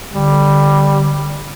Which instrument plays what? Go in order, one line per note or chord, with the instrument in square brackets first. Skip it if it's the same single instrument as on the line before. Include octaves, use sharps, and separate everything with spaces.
[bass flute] D3 [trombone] G3